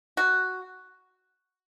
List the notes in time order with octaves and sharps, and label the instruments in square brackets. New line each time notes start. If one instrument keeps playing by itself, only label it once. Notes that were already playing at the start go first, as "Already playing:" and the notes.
[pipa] F#4